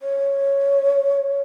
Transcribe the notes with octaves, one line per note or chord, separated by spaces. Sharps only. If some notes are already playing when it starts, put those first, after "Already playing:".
C#5